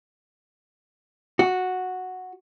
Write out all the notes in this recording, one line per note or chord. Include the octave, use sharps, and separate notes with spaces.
F#4